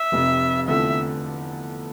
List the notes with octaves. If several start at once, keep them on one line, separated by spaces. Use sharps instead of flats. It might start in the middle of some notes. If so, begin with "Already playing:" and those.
Already playing: E5
F1 F2 C3
E2 D3 F3 A3 C4 E5